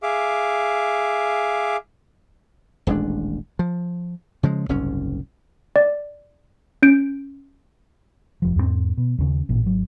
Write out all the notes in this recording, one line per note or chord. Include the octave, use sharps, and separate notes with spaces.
G#4 E5 F5 D6
D#1 A1 G#3 D4
F3
C#3 F3 G#3
F#1 C2 G#2 C#4
D5
C#4 G6 D7
F1 F3
E2 G#2 G3 C4
B2
D#2 C#3
A1 A#2
G#1 F#3